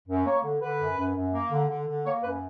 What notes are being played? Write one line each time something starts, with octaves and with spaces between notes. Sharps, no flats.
F#2
A#3 C#5
D3
D3 B4
F#2
F#2
F#2
A#3
D3
D3
D3
A#3 C#5
F#2 B4